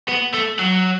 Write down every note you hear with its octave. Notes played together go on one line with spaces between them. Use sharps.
B3
A3
F#3